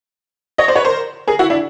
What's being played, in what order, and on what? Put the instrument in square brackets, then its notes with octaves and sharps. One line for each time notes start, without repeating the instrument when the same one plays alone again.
[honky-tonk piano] C#5 D#5
C5 D5
B4 C#5
A#4 C5
G#4 A#4
E4 F#4
D4 E4